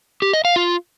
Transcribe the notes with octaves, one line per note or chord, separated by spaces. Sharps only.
G4
D#5
F5
F4